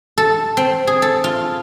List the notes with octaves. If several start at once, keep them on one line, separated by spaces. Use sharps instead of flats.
A4
C4
G#4
A4
F4